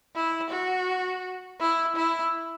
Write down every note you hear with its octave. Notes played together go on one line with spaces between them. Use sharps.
E4
F#4
E4
E4